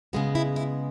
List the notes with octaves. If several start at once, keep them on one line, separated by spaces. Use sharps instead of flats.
C#3 G#3 B3 F#4
E4
E4